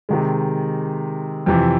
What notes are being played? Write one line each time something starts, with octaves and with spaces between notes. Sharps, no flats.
C3 D#3 G#3
F2 C3 E3